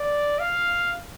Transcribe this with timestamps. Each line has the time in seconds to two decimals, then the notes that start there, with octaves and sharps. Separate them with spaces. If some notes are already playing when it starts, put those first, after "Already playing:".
Already playing: D5
0.39 F5